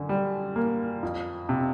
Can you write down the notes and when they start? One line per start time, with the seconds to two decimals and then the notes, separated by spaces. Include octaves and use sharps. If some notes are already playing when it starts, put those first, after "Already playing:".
Already playing: F#2 D3
0.09 G3
0.56 A#3
1.03 F2
1.49 C3